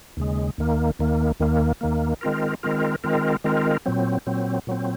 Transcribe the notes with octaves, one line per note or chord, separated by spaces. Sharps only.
D#2 C#3 G#3
D#2 D#3 A#3
D#2 D#3 A#3
D#2 D#3 A#3
D#2 D#3 A#3
D#3 G#3 C4 F4 A#4
D#3 G#3 C4 F4 A#4
D#3 G#3 C4 F4 A#4
D#3 G#3 C4 F4 A#4
A#2 F#3 C4
A#2 F#3 C4
A#2 F#3 C4